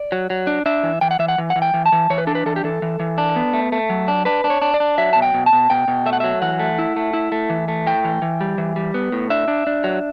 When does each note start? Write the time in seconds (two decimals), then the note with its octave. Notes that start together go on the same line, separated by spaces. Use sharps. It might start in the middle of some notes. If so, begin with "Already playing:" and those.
Already playing: D5
0.12 F#3
0.30 F#3
0.47 D4
0.66 D4 E5
0.83 E3
1.01 E3 G5
1.11 F#5
1.19 E3 E5
1.28 F#5
1.38 E3
1.50 F#5
1.56 E3
1.62 G5
1.74 E3
1.86 A5
1.92 E3
2.10 E3 C#5
2.18 B4
2.27 D4 A4
2.35 B4
2.46 E3 A4
2.56 G4
2.64 E3 A4
2.82 E3
3.00 E3
3.18 D4
3.36 B3
3.53 A3
3.72 A3
3.90 F#3
4.08 D4
4.25 D4 B4
4.44 D4
4.50 C#5
4.62 D4
4.74 D5
4.80 D4
4.98 F#3 E5
5.13 B2 A5
5.22 G5
5.34 B2
5.46 A5
5.53 B2
5.70 B2 G5
5.88 B2
6.06 A3 E5
6.13 F#5
6.20 F#3 E5
6.42 E3 F#5
6.60 A3
6.79 E4
6.96 A3
7.13 E4
7.32 A3
7.50 E3
7.68 A3
7.87 A2 G5
8.04 E3
8.22 E3
8.41 G3
8.58 E3
8.76 G3
8.94 B3
9.12 A2
9.30 D4 E5
9.48 D4
9.67 D4
9.84 F#3